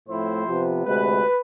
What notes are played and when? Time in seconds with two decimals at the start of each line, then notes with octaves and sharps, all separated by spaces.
0.09 A2 F3 A3 C4 E4 C5
0.48 C3 F3 B3
0.86 D2 C3 G#3 B4